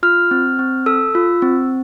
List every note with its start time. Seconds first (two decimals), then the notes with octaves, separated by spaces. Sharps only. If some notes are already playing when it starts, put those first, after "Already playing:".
0.03 F4 F6
0.31 C4
0.59 C4
0.86 A4 E6
1.15 F4
1.42 C4